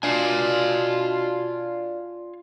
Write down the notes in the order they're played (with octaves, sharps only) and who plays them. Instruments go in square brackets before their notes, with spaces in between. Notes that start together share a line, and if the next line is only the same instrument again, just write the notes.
[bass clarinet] B2 [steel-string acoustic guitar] D4 [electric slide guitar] F4 F5 G#5